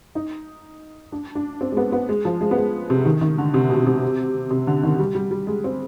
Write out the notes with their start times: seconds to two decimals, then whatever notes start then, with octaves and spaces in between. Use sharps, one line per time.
0.15 D#4
1.12 D4
1.35 D4
1.61 C4
1.72 G#3
1.77 B3
1.92 B3
2.09 G#3
2.25 F3
2.41 G#3
2.51 B3
2.57 G#3
2.90 C3
3.05 D#3
3.21 D#3
3.38 D3
3.54 C3
3.69 B2
3.87 C3
4.51 C3
4.67 D3
4.83 D#3
4.99 G3
5.15 G3
5.31 G3
5.47 G#3
5.64 C4